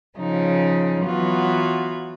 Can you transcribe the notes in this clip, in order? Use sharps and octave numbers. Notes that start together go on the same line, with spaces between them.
C#3 F3 D#4
E3 F#3 B3 F4 F#4